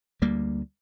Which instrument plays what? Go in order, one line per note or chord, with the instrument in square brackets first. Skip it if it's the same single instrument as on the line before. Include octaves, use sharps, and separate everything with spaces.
[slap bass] D2 G3 A#3